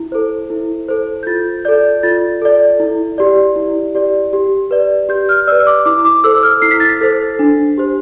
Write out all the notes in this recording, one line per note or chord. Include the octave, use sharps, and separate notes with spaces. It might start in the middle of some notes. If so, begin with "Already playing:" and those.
Already playing: E4
A4 C5
E4
A4 C5
G6
F4 A6
A4 D5 G6
F4 A6
A4 D5
E4
G4 D5
E4
G4 D5
G4
B4 D5
G4 G6
F6
B4 D5 E6
D6
E4 D6
D6
A4 C5 E6
F6
E4 C7
B6
A6
B6
A4 C5
D4
G4 C5